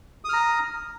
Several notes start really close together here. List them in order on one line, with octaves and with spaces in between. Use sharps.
D#6 F6 A#5